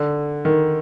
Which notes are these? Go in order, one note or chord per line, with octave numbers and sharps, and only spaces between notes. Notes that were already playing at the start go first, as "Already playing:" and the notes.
Already playing: D3
D#3